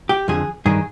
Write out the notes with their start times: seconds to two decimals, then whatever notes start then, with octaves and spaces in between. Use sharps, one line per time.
0.09 G4
0.28 F2 D3 F3 G#4
0.66 G2 D#3 G#4